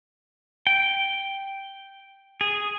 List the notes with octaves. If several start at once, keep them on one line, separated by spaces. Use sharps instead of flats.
G5
G#4